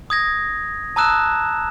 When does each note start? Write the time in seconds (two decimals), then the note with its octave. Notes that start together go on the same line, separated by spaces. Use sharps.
0.10 D#6 G#6 A#6
0.96 A5 A#5 D#6 E6 F#6 E7